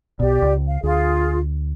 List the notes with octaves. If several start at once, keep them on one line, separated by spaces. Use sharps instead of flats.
B1 B2 G4 D5
C#2
F5
D2 F4 G#4